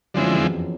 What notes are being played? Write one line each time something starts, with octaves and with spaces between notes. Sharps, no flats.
F#2 D3 F3 G#3 C4 E4
F2
E2
F2